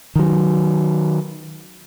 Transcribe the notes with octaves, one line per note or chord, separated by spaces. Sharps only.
D#3 F#3